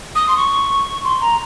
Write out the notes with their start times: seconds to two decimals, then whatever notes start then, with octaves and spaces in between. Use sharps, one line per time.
0.15 D#6
0.28 C6
0.37 C#6
1.04 C6
1.21 A#5